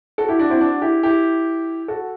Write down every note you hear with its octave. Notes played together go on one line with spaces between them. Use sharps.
F#4 A4
E4 G4
D4 F#4
C4 E4
D4 F#4
E4 G4
E4 G4
F#4 A4